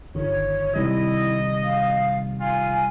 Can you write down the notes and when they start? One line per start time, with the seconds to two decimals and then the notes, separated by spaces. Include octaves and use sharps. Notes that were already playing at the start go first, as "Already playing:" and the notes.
0.15 G1 D#3 C#5
0.76 C3 D#3 G3 E4 D#5
1.63 F5
2.40 F4 G#5